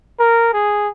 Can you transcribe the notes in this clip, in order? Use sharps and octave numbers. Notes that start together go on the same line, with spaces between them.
A#4
G#4